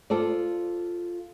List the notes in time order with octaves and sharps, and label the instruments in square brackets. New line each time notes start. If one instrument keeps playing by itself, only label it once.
[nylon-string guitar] F4 A4 C5 D5